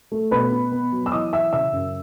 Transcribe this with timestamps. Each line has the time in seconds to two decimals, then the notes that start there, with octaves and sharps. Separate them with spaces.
0.12 A3
0.31 B2 B4 B5
0.52 B2
0.72 B3
0.92 F#3
1.06 E6
1.12 E3 D#5 D#6
1.33 E3 E5 E6
1.53 C#3 E5 E6
1.73 F#2